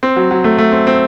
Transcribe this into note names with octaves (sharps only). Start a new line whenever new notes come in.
C4
F#3
F#3
A3
A3
C4
C4